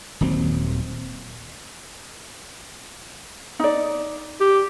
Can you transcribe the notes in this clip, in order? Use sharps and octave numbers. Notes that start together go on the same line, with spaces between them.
D#1 D#2 F#3 C4
D#4 D5
G4